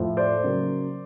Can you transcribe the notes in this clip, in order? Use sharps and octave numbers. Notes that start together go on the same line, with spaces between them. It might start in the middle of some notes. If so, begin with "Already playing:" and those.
Already playing: A2 F3 A3
C5 D5
C#3 F#3 A#3